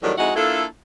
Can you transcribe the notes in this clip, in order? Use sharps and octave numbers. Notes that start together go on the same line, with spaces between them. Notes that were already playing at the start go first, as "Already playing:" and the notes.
F#2 A2 D#3 E3 F#3 G3
F2 G#3 D#4 E4 F#4 F#5
A#3 D4 E4 F4 A4